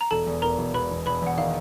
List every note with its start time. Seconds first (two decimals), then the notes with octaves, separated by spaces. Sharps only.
0.01 A#5
0.11 E1 A4 A5
0.27 E2
0.42 E1 A#4 A#5
0.58 E1
0.74 E1 B4 B5
0.90 E1
1.06 E1 B4 B5
1.22 E2 F#5
1.38 D#3 F5